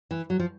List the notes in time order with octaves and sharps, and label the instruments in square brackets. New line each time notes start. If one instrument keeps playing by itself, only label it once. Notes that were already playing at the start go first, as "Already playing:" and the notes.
[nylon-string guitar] E3
F#3
F3